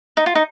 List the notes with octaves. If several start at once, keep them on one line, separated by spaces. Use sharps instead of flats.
D#4
F4
D#4